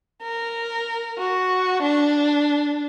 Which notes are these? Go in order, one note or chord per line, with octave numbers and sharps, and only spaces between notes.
A#4
F#4
D4